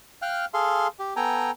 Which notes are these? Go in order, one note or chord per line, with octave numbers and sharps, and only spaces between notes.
F5 G5 F6 F#6
G#4 A4 F5 C6
G4
B3 A4 G5 G#5 A#5